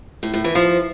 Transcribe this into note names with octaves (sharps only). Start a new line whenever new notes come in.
A2
A2
E3
F3